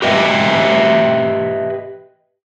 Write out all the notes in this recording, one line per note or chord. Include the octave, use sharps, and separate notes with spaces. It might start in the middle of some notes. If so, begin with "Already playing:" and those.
G4 B4 D#5 E5 G5